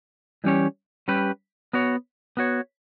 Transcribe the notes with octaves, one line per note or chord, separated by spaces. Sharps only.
E3 G3 C#4 G4 C#5
G3 C#4 G4 B4
B3 F#4 C#5
B3 F#4 C#5